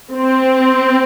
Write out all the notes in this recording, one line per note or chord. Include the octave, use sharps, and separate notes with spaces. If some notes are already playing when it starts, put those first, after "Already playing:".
C4